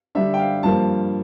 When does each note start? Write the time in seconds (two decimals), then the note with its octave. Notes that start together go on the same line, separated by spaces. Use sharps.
0.15 D3 G3 D4 E5
0.34 G5
0.39 F5
0.63 G2 F3 A#3 A5